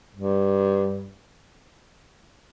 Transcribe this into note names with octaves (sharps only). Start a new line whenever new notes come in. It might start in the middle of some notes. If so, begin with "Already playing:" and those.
G2